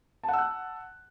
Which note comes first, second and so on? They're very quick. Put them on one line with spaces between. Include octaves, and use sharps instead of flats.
A5 F#5 E6 F#6